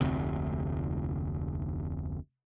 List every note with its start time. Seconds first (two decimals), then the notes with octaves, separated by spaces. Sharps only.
0.01 F1 D2 C3